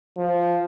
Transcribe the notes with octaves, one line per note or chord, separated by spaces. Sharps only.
F3